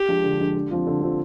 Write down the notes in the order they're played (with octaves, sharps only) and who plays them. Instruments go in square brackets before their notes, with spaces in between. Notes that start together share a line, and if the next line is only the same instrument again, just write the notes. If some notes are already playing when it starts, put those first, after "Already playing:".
Already playing: [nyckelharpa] G4
[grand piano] F3 G#3 D4
D3
F3 G#3 D4
D3
F3 C4 F4
D3
F3 C4 F4